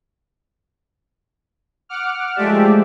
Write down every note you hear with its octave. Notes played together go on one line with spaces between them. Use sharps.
F#5 D6 F6
F3 G#3 A3 G4 D5 E5